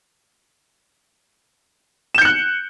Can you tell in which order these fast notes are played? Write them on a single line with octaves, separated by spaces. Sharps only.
E7 G6 C#7 F#6